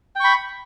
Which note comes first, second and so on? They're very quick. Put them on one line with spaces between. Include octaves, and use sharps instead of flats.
G5 C#6 B5